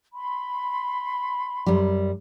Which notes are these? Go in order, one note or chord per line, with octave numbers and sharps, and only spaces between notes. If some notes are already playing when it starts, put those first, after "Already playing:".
B5 C6
F#2 G3